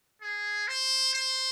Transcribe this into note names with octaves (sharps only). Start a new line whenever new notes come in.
G#4
C5
C5